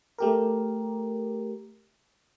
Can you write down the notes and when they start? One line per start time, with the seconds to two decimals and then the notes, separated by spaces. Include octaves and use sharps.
0.18 A3 G4 A#4